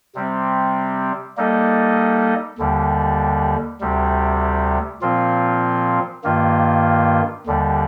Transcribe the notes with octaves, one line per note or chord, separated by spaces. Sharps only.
C3 G3 C4
G3 A#3 D#4 A4 D#5
D#2 D3 G3
D2 C3 G3
A#2 F3 C4 F4
G2 D#3 A#3 F4
D#2 D3 G3